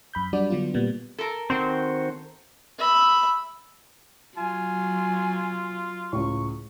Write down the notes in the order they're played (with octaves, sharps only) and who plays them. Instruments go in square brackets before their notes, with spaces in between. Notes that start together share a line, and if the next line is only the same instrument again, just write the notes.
[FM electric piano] F#2 B5 G6
F#3 G3 D4 F#4 D5
D3 F#3 B3 F4
A#2 G3 B3
[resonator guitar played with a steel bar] A4 A#4
[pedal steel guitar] D#3 F#4 C5 [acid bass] C4
[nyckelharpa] E5 B5
[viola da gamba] F#3 [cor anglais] F4 [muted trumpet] G#5
[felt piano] C#2 A2 [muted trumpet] C#6